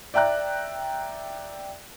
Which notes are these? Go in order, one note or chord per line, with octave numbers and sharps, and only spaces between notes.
D5 E5 G5 A#5 F#6